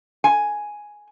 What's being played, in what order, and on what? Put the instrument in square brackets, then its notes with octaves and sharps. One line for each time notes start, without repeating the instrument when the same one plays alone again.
[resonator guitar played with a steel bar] G#5